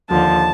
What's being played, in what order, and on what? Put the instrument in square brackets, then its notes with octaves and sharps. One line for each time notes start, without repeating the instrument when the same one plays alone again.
[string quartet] D#2 D3 F3 A5